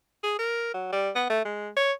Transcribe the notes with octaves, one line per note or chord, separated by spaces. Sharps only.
G#4
A#4
F#3
G3
B3
A3
G#3
C#5